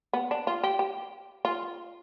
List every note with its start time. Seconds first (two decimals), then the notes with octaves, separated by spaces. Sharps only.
0.13 B3
0.31 D4
0.47 F4
0.63 G4
0.79 G4
1.45 F4